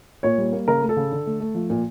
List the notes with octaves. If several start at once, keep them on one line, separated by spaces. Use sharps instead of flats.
A#2 C#5
G3
A#3
C#3 A#4
A3
A4
C#3
D3
A3
A3
F3
A#2